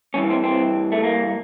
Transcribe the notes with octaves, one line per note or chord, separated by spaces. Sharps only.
G2 E3 C#4
C4
C4
A3
A#3